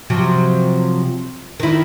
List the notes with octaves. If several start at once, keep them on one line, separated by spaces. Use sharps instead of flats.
C3 F3 F#3
D#3 E4